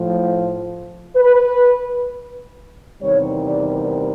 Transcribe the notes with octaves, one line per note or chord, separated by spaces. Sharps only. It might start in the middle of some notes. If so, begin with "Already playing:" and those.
Already playing: A2 F3
B4
E2 C3 D#3 G3 C#5
D5